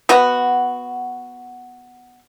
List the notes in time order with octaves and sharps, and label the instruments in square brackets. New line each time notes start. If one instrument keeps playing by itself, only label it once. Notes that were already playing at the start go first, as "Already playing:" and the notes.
[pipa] B3 F#4